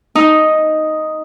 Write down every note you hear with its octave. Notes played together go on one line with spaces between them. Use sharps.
D#4